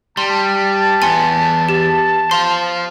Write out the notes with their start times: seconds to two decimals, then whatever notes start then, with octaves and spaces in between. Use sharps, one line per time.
0.17 G3 A5 C6
1.02 E2 B3 G#5 C6 C#7
1.69 G4
2.31 C5 F5 C6